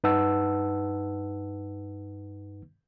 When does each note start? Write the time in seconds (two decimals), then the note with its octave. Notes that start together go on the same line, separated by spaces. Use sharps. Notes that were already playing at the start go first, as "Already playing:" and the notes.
0.04 G2 D#4 B4 F#5 A5 E6